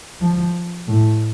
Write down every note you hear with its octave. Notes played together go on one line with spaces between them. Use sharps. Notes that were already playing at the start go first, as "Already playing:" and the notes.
F3
A2